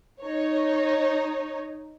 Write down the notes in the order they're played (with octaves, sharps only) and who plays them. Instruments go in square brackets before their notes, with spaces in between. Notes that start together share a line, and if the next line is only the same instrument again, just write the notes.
[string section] D#4 C#5